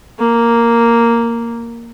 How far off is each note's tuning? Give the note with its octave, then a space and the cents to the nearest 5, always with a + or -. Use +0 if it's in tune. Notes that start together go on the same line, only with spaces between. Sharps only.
A#3 -5